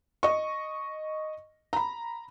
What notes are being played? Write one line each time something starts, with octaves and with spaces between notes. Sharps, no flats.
D#5 C#6
A#5 B5